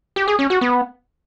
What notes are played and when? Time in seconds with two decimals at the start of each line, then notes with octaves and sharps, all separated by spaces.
0.16 G4
0.28 G#4
0.39 C#4
0.50 F#4
0.61 B3